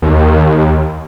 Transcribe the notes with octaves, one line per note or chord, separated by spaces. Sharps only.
D#2